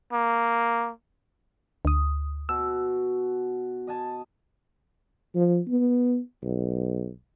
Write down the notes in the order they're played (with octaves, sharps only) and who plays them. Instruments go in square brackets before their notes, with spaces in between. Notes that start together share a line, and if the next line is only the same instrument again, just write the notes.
[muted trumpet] A#3
[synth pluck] D2 D#6
[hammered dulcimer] B2 [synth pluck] E6
[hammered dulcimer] D#5 G#5 A5
[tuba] F3
B3
B1